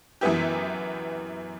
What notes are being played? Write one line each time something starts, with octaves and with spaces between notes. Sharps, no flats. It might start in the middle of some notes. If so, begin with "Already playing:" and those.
F#2 E3 B3 E4 G4